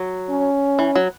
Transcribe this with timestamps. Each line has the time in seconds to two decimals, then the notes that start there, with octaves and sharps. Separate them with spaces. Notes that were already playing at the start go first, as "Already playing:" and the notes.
Already playing: F#3
0.30 C#4
0.79 E3
0.96 F#3